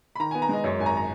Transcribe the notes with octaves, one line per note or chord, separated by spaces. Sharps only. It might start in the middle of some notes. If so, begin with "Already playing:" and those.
B5
D#3 A#5
B3 G#5
A#5
G#3 D#5
F#2 C#5
G#1 G#5
A#5
A#5